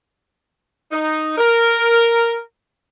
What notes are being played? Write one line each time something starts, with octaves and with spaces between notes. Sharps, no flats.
D#4
A#4